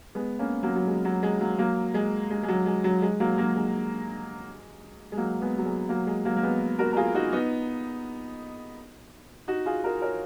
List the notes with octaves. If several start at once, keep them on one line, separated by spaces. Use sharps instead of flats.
G#3 B3
A#3 C#4
F#3 A#3
F#3
G#3
F#3
G#3
F#3 A#3
F#3 A#3
G#3
G#3
G#3
F#3
G#3
F#3
G#3
F#3 A#3
F#3 A#3
G#3
G#3
F#3 A#3
G#3 B3
F#3
G#3
F#3 A#3
G#3
F#3 A#3
A#3
G#3 B3
F#4 A#4
A#4
F4 G#4
D#4 F#4
B3 D#4
D#4 F#4
F4 G#4
F#4 A#4
A#4 C#5